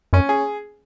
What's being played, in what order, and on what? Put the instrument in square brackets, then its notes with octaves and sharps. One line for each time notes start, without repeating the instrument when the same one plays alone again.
[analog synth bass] F#2 [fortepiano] C#4
[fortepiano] G#4